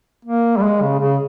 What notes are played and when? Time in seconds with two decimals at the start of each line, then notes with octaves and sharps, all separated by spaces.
0.25 A#3
0.57 G3
0.63 G#3
0.82 C#3
0.99 C#3